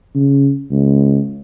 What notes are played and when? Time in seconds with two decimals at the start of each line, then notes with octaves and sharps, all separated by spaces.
0.15 C#3
0.71 C#2